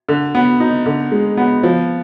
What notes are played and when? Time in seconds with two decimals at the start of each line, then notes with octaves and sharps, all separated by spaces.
0.09 D3
0.35 B3
0.60 D#4
0.86 D3
1.12 G#3
1.37 B3
1.63 F3